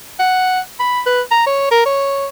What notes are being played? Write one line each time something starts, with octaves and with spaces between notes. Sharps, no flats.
F#5
B5
B4
A#5
C#5
A#4
C#5